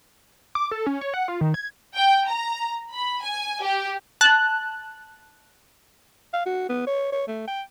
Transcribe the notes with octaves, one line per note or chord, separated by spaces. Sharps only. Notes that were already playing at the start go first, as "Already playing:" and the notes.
D6
A4
C#4
C#5
F#5
F4
D#3
G#6
G5
A#5
B5
G#5
G4
A5 F#6
F5
F#4
B3
C#5
C#5
A3
G5